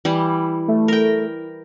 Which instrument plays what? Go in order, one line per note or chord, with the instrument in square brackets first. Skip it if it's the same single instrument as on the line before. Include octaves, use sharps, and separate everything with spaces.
[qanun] E3 G3 E4
[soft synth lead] A3
[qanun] A#4 G5